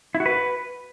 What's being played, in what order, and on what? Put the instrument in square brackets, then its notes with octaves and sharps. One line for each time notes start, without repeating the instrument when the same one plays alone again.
[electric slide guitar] E4
F#4
B4